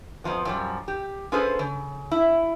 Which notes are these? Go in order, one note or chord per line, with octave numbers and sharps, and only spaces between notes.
F2 G#2 F3 B3
F#2 F3 G3
G4
C#4 F4 G#4 A4 B4 C5
C#3
E4